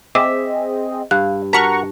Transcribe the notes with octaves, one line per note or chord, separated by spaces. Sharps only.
C4 G#4 D#5 E5 D6
G2 F5 F#6
F#4 A#4 A5 A#5 C#6 F#6 B6